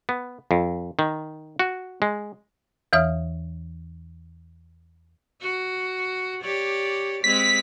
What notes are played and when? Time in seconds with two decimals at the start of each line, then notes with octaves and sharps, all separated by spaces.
0.09 B3
0.51 F2
0.99 D#3
1.59 F#4
2.02 G#3
2.93 E2 E3 C#5 E5 D#6 F6
5.42 F#4
6.42 G4 C#5 D5
7.24 G#3 C4 B6